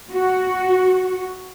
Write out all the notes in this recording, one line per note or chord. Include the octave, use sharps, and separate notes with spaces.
F#4